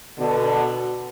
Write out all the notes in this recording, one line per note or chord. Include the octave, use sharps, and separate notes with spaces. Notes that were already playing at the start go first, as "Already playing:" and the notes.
B2 D3